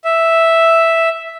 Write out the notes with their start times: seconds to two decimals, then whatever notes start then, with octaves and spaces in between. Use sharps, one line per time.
0.04 E5